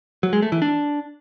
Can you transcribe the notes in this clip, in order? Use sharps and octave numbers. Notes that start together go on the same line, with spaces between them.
F#3
G#3
A3
E3
D4